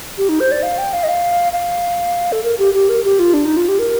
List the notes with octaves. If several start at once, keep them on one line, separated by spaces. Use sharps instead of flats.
G4
D#4
C5
D5
F5
G5
F5
D#5
F5
F5
A4
A#4
G4
G4
A#4
G4
F4
D4
D#4
F4
G4
A#4